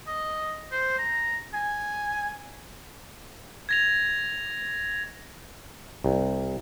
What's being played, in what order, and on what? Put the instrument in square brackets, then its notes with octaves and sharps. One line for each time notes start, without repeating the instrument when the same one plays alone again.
[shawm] D#5
C5
A#5
G#5
[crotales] G#6 A#6 F7
[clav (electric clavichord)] C2